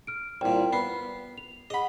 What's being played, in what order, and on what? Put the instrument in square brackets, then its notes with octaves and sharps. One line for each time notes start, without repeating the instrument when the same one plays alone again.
[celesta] F6 D7
[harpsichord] C2 A#2 [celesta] G5
[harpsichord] B3 [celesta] C7
[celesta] F7
[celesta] G#4 F#5 [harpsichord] D#5 B5